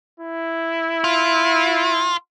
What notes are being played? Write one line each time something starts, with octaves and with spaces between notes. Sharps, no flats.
E4
F4